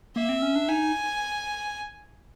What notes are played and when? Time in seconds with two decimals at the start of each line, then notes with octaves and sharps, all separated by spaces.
0.16 A#3 E5
0.29 C4
0.42 C#4
0.55 D4
0.68 D#4 G#5